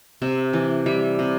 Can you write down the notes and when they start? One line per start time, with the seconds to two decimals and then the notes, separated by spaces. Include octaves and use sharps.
0.22 C3 E5
0.53 E3
0.86 G3 E5
1.19 C3